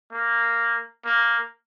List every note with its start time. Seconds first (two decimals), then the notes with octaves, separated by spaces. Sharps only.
0.12 A#3
1.05 A#3